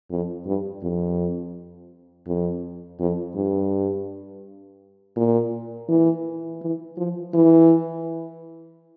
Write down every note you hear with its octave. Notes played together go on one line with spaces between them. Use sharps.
F2
G2
F2
F2
F2
G2
A#2
E3
E3
F3
E3